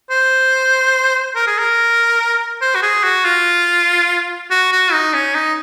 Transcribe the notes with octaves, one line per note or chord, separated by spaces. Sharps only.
C5
A#4
G#4
A#4
C5
F#4
G#4
F#4
F4
F#4
F#4
D#4
C#4
D#4